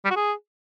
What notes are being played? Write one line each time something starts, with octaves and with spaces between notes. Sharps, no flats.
G3
F#4
G#4